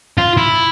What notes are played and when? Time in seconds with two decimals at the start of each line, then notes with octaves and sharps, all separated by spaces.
0.18 F4
0.37 E4